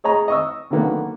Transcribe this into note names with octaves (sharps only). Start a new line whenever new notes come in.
G#4 C#5 D#5 A#5
D#5 C#6 E6
D3 D#3 F#3 A#3 B3